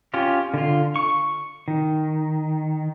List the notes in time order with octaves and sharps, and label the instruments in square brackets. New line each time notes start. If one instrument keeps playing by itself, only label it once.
[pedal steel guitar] C#4 F4 G4
D3 F4
C#6
D#3